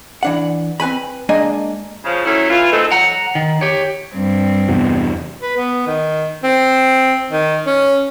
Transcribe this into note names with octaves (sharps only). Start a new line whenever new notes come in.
E3 D4 F#5
C4 B4 G#5 B5
G#3 A#3 D4 D#5 G#5
C#3 F3
F#3 A3 C#4 E4
E3 F4
A3 C4 D#4 A4
F#5 A#5
D#3
G4 C#5
G2 C4
E2 C3 B3
B4
B3
D#3
C4
D#3
C#4